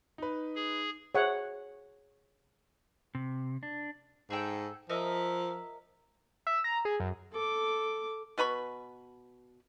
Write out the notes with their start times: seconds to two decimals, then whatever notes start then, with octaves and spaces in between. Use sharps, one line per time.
0.18 D#4 B4
0.55 G#4
1.15 G#4 C5 C#5 E5 F#5
3.15 C3
3.63 D4
4.30 G#2 G#4 A4 G5
4.89 F3 A#4 D#5 E5
6.47 E5
6.64 A#5
6.85 G#4
7.00 F#2
7.32 A4 D6
8.38 B2 B4 B5 C#6